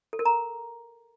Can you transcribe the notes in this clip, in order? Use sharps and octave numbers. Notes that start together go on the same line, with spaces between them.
A4
A#4
A#5